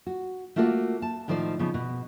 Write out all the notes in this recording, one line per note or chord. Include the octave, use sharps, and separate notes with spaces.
F#4
A3 A#3 F4 F#4 C5 D5
A5
A2 D#3 F3 C5 D5
C#3 F3 B3 D#4
B2